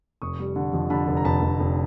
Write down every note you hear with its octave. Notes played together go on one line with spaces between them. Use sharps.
F1 C#6 D#6
G3
D3
F2
D3 A5 B5
F1
A#5
F1 A5 B5
F1
F1